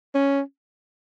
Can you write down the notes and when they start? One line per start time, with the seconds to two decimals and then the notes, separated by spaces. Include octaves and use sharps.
0.15 C#4